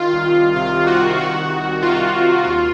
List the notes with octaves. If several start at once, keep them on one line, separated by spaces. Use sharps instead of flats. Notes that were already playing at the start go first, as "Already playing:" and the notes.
Already playing: D#3 F4
C2
C2
C3 F4
D#3
F#4
C2
D#3 F#4
C2
C2
C3 F4
D#3
C2
D#2 F4